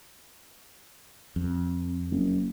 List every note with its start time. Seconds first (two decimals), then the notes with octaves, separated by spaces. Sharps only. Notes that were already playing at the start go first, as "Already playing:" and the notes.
1.36 F2
2.11 F#1